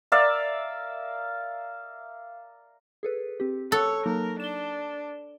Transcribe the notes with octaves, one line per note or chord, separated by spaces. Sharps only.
A#4 D5 E5 F5
G#4 A4 B4
C4 G4
A4 C#5 F#6
F#3 A#3 D#4 A#4
D4 E7 G7